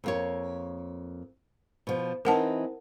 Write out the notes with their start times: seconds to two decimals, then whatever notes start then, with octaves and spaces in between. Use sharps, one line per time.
0.04 F2 A#3 C#5
1.87 B2 F3
2.25 E3 C4 D#4 A#4 F#5 A5